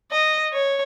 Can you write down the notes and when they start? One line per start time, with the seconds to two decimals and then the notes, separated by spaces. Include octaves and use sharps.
0.12 D#5
0.53 C#5